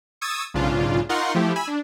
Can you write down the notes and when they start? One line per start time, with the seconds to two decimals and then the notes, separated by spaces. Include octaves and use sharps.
0.21 C#6 D#6 E6 G#6 A6
0.54 B1 G#2 C#3 D4 F4
1.09 D#4 F4 A#4 F#5 C6 C#6
1.35 F3 A3 E4 G4
1.56 G#5 B5 E6
1.67 D4